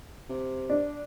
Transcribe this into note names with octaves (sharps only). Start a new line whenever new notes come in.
C3
D4